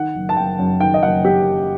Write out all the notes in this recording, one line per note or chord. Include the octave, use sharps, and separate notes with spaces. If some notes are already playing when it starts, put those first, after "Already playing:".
Already playing: D#3 F#5
F#1
A5
F#1 G5
F#2
D#3 G5
D#5
F#1 F#5
G4